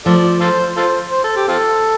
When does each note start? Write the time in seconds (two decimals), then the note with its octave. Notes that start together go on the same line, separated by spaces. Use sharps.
0.05 F3 A3 F4 A4 D5
0.40 F4 A4 C5
0.77 F4 A4 C5
1.11 C5
1.24 A4
1.36 G4
1.48 C4 F4 A4